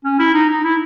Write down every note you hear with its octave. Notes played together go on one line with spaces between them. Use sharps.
C#4
E4
D#4
D#4
E4